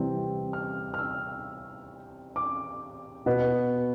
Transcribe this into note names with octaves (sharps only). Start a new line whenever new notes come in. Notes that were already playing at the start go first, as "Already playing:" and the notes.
Already playing: C3 E3 G3 C4
F6
F6
E6
D6
B2 B3